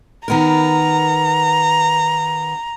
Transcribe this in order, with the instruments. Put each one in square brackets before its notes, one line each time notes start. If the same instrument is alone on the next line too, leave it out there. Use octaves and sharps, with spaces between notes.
[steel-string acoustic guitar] D#3 B3 A#4 [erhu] A#5